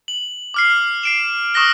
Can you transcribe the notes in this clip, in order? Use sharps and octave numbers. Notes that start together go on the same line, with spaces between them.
F#7
D6 F6 C7
C7 D7 E7
C#6 D#6 F#6 A#6 G7